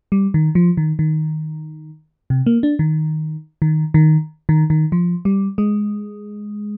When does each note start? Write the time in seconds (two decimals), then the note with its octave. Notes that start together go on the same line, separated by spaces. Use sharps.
0.12 G3
0.34 D#3
0.55 F3
0.77 D#3
0.99 D#3
2.30 C3
2.46 A#3
2.63 D4
2.79 D#3
3.62 D#3
3.94 D#3
4.49 D#3
4.70 D#3
4.92 F3
5.25 G3
5.58 G#3